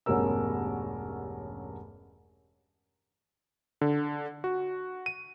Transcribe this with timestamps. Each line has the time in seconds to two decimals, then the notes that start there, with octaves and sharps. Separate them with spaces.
0.06 E1 A1 G2 C#4 A#4 E6
3.81 D3
4.44 F#4
5.06 D#7